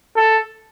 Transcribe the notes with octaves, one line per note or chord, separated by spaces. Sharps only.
A4